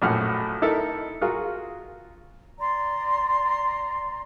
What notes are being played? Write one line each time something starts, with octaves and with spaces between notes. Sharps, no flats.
A#1 F#2 A2 F#5 F6
D#4 E4 A4 A#4 E5
F4 F#4 G#4 A#4
D5 A#5 C6